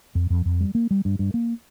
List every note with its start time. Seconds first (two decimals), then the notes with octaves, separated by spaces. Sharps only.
0.15 F2
0.30 F2
0.45 F2
0.61 G3
0.75 A#3
0.91 G3
1.05 G2
1.19 G2
1.34 A#3